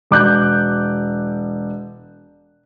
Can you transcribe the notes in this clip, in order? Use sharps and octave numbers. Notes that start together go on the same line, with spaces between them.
E1 D6 F#6 G6